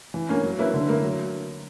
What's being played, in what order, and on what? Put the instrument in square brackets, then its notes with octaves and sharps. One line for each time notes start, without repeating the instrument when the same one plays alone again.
[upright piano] E3
A#3 C#4
F#3
A#3 E4 B4
D3
A#3 E4 A#4
F#3